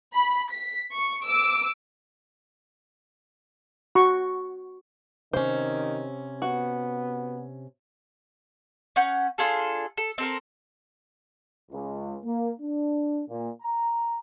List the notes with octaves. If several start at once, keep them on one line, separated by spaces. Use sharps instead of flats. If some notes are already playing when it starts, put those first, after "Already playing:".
B5
B6
C#6
D6 E6 D7
F#4 C#6
C3 D#3 C#4 C5
B3 F#4
C#4 F#5 G6
D4 F4 G#4 A4
A4
C4 A4 A#4
C#2
A#3
D4
A#2
A#5